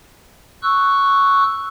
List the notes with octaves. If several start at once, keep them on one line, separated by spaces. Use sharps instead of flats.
C#6 E6 F#6